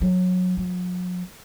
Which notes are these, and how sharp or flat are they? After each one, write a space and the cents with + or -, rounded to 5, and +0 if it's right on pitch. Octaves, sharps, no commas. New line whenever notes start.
F#3 -20
F#3 -45